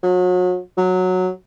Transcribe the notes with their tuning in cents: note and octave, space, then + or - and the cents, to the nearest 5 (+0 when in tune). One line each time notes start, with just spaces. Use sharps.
F#3 -35
F#3 -10